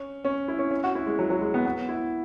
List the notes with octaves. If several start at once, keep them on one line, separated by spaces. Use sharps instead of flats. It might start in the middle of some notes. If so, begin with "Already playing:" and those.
Already playing: C#4
C#4
E4
C#4
C#4
F#4
E4
G#3
F#3
F#3
G#3
B3
B3
E4